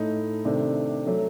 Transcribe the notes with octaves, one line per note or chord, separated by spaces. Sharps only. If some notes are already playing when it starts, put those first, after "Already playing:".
Already playing: A2 A3 D#4
C3 D#3 A3 D4
F#3 A3